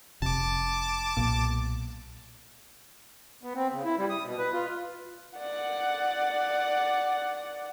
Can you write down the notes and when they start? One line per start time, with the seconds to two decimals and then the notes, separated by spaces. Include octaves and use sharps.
0.22 F1 C3 A5 D6
1.17 B1 A#2
3.43 B3
3.55 C4
3.72 C#3
3.84 E4
3.98 G3
4.10 D#6
4.25 B2
4.38 B4
4.52 F4
5.39 D5 F#5